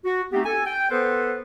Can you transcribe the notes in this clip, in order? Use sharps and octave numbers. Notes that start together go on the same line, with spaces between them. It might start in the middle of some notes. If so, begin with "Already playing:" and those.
F#4
A3 B3 C4 D#4 G4
A4 G#5
G5
B3 A4 B4 C5